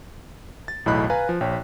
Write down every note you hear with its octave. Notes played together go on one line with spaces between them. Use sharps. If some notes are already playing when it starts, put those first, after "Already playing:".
A6
B1 E2 A2 D#5 B5 F#6
B4 F5 G#5 A#5
F3
A#1 C#5 G5